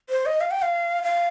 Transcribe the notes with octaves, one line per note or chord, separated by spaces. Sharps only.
C5
D#5
F5
G5
F5
F5